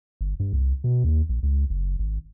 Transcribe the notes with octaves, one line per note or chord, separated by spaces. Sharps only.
G1
G2
C2
B2
D#2
A#1
C#2
F#1
G#1